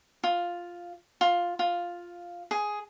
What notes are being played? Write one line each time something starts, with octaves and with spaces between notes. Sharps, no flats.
F4
F4
F4
G#4